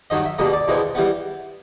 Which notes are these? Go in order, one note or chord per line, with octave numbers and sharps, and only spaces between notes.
G2 D#3 F#3 D#5
E5
C#2 B2 G3 A#3 D#5
D5
E2 B2 G#3 C4 E4
E3 G3 B3